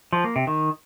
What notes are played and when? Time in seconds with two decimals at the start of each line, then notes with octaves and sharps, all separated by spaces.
0.12 F3
0.24 A#3
0.36 C3
0.47 D#3